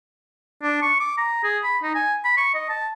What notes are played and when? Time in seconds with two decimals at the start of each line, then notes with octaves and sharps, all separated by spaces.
0.63 D4
0.82 C#6
1.00 D6
1.18 A#5
1.44 G#4
1.64 B5
1.83 D#4
1.95 G#5
2.25 B5
2.37 C#6
2.54 D#5
2.69 A5